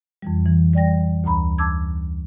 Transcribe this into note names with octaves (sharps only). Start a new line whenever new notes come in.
F2 E3 G3
E3
G3 D5 G5 A#6
D2 A#2 A#5 B5
A5 D6 E6 G#6